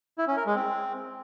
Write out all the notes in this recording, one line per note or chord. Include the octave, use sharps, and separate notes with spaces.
E4
C#4
A#4
G#3
C4